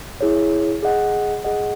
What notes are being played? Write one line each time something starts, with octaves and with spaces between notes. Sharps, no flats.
E4 G#4 C#5
G#4 D#5 F#5
G#4 D#5 F#5